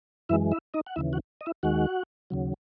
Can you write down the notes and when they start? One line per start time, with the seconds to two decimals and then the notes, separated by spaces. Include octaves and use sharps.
0.29 F#2 E3 G#3 E4 E5
0.52 E4 E5
0.74 D#4 D#5
0.86 F#5
0.96 D#2 C#3 E3 E4 E5
1.13 F#4 F#5
1.41 D#5
1.46 E4 E5
1.63 D#2 D#3 G#3 F#4 F#5
2.30 D#2 C#3 F#3